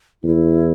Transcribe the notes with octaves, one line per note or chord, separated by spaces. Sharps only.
E2 E4